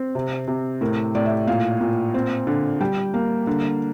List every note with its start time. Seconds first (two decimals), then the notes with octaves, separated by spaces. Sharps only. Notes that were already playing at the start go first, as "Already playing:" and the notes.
Already playing: C4
0.15 C3
0.48 C3
0.81 A2 A#4
1.15 A2 D5
1.25 E5
1.47 A#2 F5
1.81 A#2
2.14 C4
2.47 D3
2.81 G3 G5
3.14 A#3
3.47 D3